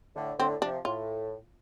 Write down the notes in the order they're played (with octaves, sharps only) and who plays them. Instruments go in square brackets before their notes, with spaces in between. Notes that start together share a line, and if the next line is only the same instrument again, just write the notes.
[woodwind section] A2 D3
[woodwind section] A2 D3 [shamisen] C4
[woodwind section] C3 F3 [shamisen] D4
[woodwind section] A2 [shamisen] F4